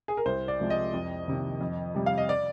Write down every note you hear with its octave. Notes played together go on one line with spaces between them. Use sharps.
G#4
A#4
C2 C5
D5
C3 F3 G#3
D#5
F2
C3 D#3 A#3
F2
C3 G3
F5
D#5
D5